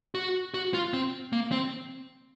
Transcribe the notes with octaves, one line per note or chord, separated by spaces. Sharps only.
F#4
F#4
F4
C4
A#3
C4